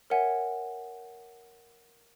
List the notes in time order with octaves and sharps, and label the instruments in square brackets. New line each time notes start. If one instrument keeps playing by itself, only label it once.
[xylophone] A#4 C#5 E5 F#5 G#5 G#6